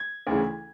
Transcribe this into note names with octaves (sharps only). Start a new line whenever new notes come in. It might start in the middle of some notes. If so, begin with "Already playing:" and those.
Already playing: G#6
D2 C#3 E3